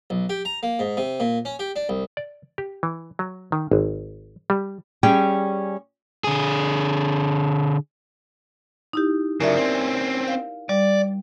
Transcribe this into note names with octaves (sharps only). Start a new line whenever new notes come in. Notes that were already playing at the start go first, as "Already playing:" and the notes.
B1
G4
A#5
A#3
G#2
C3
A#2
C#4
G4
D4
C2
D5
G4
E3
F#3
D#3
G#1
G3
G3 C#4 G#4 G5
D3 G#4
D#4 E4 G4
C#3 F#3 A#4 D5 E5
C4 C#4
F5
G3 D5